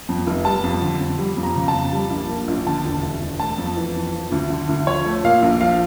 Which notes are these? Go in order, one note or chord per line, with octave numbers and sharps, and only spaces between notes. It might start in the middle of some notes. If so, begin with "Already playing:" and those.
F2
F1
G3 A5
F2
D3
F2
G3
F2
A#5
C#3
A5
F2
G3
A#1
A#2
A#1
D3 A5
E1
D2
E1
A3 A5
F2
E3
F2
F3
D2
D3
D2
F3 C#5
A3
A#2 F5
A#1
F3 F5